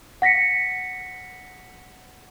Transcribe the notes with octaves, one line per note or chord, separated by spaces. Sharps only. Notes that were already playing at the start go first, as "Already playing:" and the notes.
F#5 A#6 B6 C#7